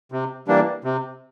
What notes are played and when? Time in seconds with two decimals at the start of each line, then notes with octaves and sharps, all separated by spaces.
0.12 C3
0.47 E3 G3 A#3 D4
0.84 C3